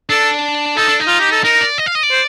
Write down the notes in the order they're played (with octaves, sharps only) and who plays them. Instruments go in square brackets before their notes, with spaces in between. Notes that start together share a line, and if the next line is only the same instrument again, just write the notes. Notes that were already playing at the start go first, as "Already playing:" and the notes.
[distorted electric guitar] D4 [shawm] A4
[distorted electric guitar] D#4 [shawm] A4
[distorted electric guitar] D4
D#4
[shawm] F4
G4
A4
[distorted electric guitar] D#4 [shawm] A#4
[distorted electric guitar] D5
D#5
F5
D#5
D5
[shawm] C5